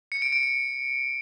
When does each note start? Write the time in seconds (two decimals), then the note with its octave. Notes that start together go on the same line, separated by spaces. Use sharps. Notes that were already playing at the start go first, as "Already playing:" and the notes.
0.12 C#7
0.22 D7
0.32 D7
0.43 D7